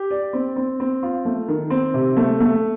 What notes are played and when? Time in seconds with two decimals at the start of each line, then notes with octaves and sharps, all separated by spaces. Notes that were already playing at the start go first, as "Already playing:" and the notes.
Already playing: G4
0.11 D5
0.33 C4
0.56 C4
0.80 C4
1.03 F4
1.25 A3
1.48 D#3
1.70 C4
1.94 C3
2.17 A3
2.40 A3